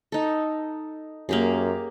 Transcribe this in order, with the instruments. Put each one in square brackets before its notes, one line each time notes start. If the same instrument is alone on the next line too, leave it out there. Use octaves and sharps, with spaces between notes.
[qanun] D#4 A4
[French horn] F#2 [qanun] A#3 G4 G#4